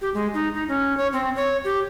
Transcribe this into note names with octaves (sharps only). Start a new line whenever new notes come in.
G4
G#3
D#4
D#4
C#4
C#5
C4
C#5
G4